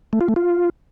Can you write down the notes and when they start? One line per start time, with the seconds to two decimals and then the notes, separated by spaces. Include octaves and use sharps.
0.13 A3
0.21 F4
0.28 A3
0.36 F4